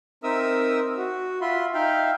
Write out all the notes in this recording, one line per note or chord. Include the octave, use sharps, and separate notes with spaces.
C4 D#4 A#4 E5 D#6 E6
F#4
F4 E5 B5 C6
D#4 E5 F5 G5